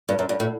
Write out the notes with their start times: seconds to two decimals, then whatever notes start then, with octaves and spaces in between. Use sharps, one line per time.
0.09 G2
0.19 F#2
0.29 G2
0.40 A2